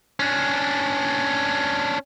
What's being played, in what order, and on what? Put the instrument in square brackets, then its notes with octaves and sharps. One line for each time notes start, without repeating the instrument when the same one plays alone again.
[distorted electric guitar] C#4 D4